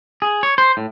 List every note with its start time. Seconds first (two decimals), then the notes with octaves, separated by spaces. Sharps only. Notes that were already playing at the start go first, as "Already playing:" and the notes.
0.22 G#4
0.43 C#5
0.58 C5
0.77 A2